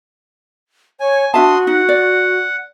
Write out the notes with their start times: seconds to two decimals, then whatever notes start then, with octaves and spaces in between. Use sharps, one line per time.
1.00 C#5 G#5
1.34 D4 F#4 E5 A5 C6 D#6
1.67 D#4 F#5
1.89 D5